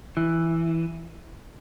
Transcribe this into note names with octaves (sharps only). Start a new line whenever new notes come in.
E3